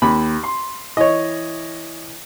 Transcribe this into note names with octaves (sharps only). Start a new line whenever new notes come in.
D#2 B5
C6
E3 C#5 D#5